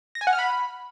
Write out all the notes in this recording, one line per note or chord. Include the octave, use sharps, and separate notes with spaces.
A#6
G#5
F#5
F6
B5